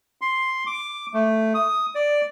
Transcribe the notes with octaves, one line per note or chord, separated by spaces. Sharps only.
C6
D6
A3
D#6
D5